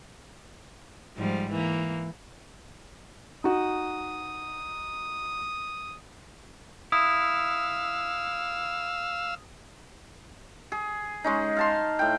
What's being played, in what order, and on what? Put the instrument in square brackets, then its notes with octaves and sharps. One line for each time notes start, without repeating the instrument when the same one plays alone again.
[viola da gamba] G#2 F3 G3
E3 A#3
[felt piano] D#4 F#4 [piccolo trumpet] D#6
[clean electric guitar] E4 [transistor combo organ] F5 E6 [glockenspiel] D#6
[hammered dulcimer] G#4
G#3 C#4 D#4
F5 A5 C6
A2 G5